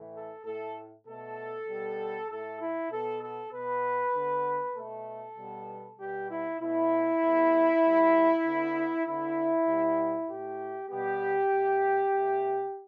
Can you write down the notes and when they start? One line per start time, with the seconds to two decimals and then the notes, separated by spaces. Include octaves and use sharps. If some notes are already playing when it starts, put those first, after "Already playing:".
Already playing: A2 E3 A3
0.14 A4
0.45 A2 A3 A4
1.07 B2 A3 A4
1.68 B2 G3 B3
2.29 A2 A3 A4
2.60 E4
2.91 B2 B3 A4
3.22 A4
3.52 B2 B3 B4
4.14 D3 B3
4.75 B2 A3 A4
5.36 B2 G3 B3
5.97 B2 G3 B3 G4
6.29 E4
6.59 B2 A3 E4
7.21 A2 G3 B3
7.82 A2 G3 B3
8.43 D3 B3
9.05 D3 B3 E4
9.66 B2 G3 B3
10.27 A2 A3 G4
10.88 B2 G3 B3 G4
11.50 B2 A3
12.12 B2 A3